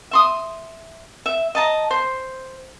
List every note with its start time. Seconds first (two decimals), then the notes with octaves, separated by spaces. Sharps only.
0.11 E5 C6 D#6
1.26 E5
1.55 D#5 A5 A#5
1.91 C5